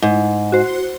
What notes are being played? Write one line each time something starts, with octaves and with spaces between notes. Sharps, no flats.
G#2
F#4 C5